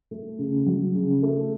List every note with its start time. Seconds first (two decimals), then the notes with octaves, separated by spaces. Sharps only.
0.11 A3
0.39 C#3
0.66 F#3
0.95 C#3
1.23 A3